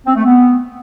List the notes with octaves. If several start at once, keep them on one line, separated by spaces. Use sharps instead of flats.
C4
A3
B3